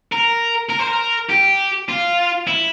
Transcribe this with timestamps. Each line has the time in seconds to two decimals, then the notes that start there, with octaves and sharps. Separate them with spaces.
0.12 A#4
0.70 A#4
0.80 C5
0.88 A#4
1.30 G4
1.89 F4
2.48 E4